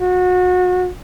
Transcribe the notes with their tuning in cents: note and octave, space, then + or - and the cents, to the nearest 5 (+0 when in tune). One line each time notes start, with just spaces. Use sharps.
F#4 -30